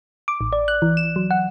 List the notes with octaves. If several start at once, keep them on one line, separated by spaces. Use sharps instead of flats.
D6
A1
D5
F#6
E3
E7
F#3
F#5